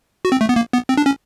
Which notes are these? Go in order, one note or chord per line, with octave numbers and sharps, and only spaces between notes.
F#4
C4
A3
B3
A#3
B3
C4
D4
C#4